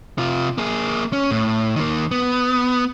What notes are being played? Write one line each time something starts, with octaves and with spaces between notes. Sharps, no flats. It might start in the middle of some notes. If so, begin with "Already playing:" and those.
C3 F4
A#3 G#4
C#4
A2
D#3 A#3
B3